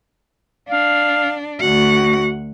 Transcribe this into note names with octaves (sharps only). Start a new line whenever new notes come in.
D4 F5
D2 F#4 F#5